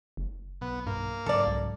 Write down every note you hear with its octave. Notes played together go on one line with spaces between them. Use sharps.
F#1
B1 B3
G2 A#3
G#2 C#3 F#3 A4 D5
C2